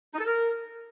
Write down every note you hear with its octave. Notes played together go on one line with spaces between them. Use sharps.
D#4
A4
A#4